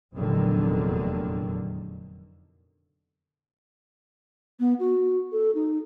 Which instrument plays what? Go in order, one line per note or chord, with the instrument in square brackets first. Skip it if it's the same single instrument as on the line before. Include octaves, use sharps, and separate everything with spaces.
[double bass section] F1 E2 A#2 D3 D#3 F#3
[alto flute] B3
F#4
A4
D#4